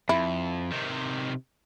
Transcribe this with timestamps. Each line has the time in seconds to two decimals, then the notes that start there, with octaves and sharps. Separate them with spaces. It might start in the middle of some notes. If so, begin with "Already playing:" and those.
0.09 F2 E4
0.72 C3 D#3